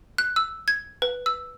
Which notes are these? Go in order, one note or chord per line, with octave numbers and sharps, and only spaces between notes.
F#6
E6
G#6
B4
E6